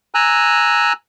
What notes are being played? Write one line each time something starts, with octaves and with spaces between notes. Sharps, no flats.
G#5 A#5 E6 F#6